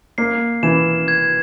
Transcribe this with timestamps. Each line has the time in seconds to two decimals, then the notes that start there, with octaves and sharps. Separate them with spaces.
0.18 A#3 C7
0.63 E3 E7
1.08 G#6